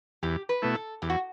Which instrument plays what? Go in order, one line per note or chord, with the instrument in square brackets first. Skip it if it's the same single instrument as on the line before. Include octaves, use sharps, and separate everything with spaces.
[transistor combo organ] E2 [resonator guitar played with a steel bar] G4
[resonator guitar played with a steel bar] B4
[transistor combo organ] B2 A3 E4
[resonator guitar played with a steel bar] A4
[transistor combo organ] E2 [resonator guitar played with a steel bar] G4
[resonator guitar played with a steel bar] F#4